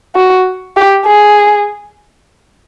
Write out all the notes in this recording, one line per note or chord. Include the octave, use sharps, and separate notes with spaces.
F#4
G4
G#4